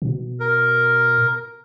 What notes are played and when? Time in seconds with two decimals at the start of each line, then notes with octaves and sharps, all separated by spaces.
0.02 B2
0.40 A#4